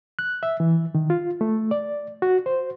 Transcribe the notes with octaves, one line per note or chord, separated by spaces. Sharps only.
F#6
E5
E3
D#3
F4
A3
D5
F#4
C5